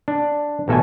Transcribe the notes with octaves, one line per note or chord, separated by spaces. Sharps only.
D4
A1 B2 A4 E5 G#5